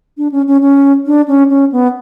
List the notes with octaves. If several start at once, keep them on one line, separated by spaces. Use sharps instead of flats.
D4
C#4
C#4
C#4
D4
C#4
C#4
B3